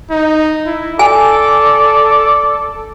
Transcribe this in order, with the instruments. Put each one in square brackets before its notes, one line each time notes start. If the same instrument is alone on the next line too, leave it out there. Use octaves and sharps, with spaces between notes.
[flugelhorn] D#4
E4
[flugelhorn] A4 [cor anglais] D5 [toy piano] G#5